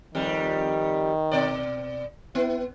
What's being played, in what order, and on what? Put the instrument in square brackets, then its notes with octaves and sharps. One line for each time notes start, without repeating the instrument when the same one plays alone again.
[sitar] F2 G3 [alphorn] D#3
[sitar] B2 D5
[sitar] B3 [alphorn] E4